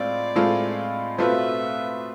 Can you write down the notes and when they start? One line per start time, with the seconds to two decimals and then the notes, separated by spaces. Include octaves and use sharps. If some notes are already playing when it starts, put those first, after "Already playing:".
Already playing: A2 G#3 C4 F4 D5
0.35 A2 G#3 C4 F4 A4
1.18 B2 A3 C4 F4 B4 E5